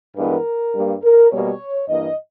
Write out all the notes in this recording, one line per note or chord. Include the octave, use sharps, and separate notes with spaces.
G2 E3 G#3 B3 A#4
G2 G3 A#3
A#4
B2 G3 A#3 C#5
G2 E3 A#3 D#5